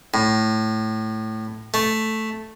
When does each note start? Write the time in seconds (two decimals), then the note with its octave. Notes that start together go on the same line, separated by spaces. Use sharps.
0.14 A2
1.74 A3